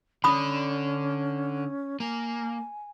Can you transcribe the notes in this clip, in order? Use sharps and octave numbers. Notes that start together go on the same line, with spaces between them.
D3 C#4 D4 B5 D#6
A#3 G#5